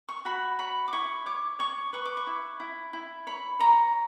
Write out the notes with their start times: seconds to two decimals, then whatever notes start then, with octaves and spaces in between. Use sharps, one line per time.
0.09 C#6
0.25 F#4 B5
0.59 C#5 B5
0.88 D6
0.92 E4 C#6
1.26 C#5 D6
1.59 C#5 C#6
1.93 B4 C#6
2.05 D6
2.17 C#6
2.27 E4
2.60 E4
2.93 E4
3.27 C#5 B5
3.59 C#5 A#5